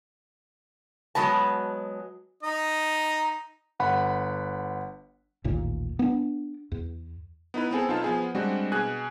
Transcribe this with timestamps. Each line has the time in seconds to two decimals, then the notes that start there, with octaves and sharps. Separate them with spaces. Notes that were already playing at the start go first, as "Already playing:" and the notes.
1.15 F#3 G#3 B3 A5
2.43 D#4 D#5
3.80 G1 F#5 B5
5.44 A1 D#2 A#2
5.99 B3 D4
6.72 E2
7.54 B3 D#4 E4 B4
7.71 B3 C4 G#4 A4
7.88 B1 D#4 F4 F5 A5
8.04 F3 B3 G#4
8.35 G3 G#3 C4 D4 F#4
8.72 B2 G#4 G#5 F#6